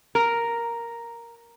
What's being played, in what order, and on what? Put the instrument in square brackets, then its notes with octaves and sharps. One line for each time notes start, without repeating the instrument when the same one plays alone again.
[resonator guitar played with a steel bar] A#4